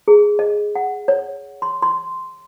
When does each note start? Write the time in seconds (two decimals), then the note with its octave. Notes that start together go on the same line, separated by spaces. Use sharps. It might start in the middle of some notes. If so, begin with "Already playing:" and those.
0.08 G#4
0.39 D#5
0.75 F#5
1.08 C#5
1.62 C6
1.82 C6